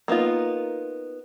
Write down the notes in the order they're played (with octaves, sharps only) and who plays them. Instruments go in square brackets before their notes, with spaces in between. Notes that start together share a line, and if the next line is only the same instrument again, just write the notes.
[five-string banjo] A#3 B3 D#4 F4